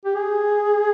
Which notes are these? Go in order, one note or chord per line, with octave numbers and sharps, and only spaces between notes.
G4
G#4